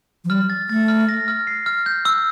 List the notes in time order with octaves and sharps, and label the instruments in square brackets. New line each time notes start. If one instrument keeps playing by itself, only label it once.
[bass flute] F3
[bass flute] G3 [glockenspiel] F6
[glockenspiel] A6
[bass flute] A3 [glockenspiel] A6
[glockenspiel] F6
A#6
F6
C7
F6
G6
E6